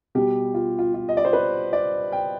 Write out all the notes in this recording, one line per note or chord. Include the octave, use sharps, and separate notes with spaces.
B2 G3 G4
F4
F4
F4
D#5
D5
C5
B4
D5
G5